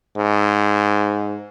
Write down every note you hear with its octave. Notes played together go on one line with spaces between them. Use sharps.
G#2